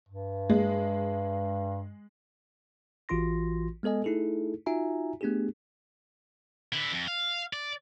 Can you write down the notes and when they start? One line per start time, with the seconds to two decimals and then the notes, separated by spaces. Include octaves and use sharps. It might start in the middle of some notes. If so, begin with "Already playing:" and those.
0.09 G2
0.50 G#3
3.09 A1 E3 F4 F#4 C6 A#6
3.83 G#3 B3 A4 D#5 G#5
4.04 A3 D#4 E4 G#4 A4
4.66 D#4 F4 F#4 E5 G#5 A#5
5.21 A3 B3 D4 G4 G#4
6.73 D3 E4
6.92 F2
7.08 F5
7.53 D5